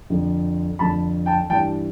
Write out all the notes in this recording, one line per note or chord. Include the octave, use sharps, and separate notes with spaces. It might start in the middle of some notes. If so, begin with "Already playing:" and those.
F2 D3 F3
F2 D3 F3 A5 B5
G5 A5
G2 E3 G5 A5